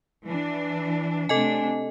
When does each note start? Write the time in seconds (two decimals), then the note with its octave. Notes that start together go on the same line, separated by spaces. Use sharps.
0.24 E3 D4
1.29 C3 A3 D4 A4 D#5 G#5